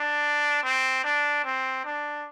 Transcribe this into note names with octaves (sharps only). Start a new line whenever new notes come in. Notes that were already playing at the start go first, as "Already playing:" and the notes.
Already playing: D4
C4
D4
C4
D4